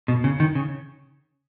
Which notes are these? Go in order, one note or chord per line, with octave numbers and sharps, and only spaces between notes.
B2
C#3
D#3
C#3